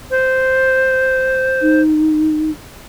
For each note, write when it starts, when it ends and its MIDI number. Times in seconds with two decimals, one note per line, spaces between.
0.11 1.81 72
1.62 2.51 63